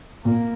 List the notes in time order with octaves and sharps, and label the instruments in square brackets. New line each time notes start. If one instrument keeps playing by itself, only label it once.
[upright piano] A#2 [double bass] A#3